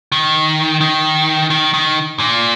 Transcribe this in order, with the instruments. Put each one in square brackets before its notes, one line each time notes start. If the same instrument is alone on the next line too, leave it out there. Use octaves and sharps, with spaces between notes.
[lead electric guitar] D#3
D#3
D#3
D#3
A#2